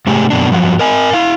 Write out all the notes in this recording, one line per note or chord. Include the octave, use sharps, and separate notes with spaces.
G#2 C3 A3 G4 G#4
F#2 B2 D4
G2 F3 F#3
A#4 D#5 G#5
E4 F5